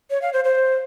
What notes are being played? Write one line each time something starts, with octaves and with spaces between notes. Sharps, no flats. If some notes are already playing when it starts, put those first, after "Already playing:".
C#5
F5
C5
C5